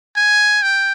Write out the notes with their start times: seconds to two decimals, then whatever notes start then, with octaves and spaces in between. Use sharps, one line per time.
0.16 G#5
0.62 G5